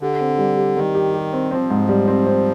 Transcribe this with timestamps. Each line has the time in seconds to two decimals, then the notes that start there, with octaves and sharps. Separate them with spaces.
0.01 D3 G4
0.20 C4
0.38 G3
0.57 G4
0.76 D#3 G3
0.95 G4
1.14 G4
1.33 C4
1.51 F3 C4
1.70 G#2
1.89 G3
2.08 C4
2.27 C4